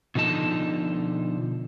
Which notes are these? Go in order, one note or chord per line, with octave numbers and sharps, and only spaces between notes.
B2 D3 F3 D#4 A5